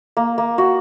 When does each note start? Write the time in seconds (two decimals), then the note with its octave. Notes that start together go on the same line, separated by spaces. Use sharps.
0.17 A#3
0.38 A#3
0.58 F#4